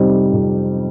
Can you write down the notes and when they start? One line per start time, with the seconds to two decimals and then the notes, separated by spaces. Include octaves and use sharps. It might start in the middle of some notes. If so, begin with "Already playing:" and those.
Already playing: F2 C3 G3 D#4 C5
0.32 F2